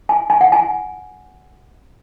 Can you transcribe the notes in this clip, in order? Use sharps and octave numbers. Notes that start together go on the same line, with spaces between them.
G#5
G#5
F#5
G#5